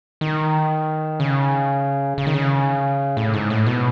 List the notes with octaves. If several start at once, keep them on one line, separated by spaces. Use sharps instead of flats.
D#3
C#3
C#3
D#3
C#3
A2
G#2
A2
B2